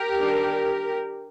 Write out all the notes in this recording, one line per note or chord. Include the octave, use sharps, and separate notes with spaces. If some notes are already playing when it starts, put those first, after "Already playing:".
Already playing: G4 A#4
D#3 G3 D4